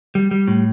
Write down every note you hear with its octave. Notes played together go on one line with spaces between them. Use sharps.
G3
G3
A2